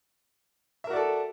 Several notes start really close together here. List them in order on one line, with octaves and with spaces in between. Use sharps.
E5 A#4 F#4 D5 A4